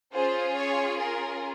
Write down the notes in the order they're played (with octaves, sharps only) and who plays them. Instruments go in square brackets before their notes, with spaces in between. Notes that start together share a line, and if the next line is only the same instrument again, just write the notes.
[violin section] C#4 F4 G#4 C5
C#5
A#4